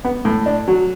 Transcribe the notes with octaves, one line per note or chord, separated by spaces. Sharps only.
B3
A2
D4
F#3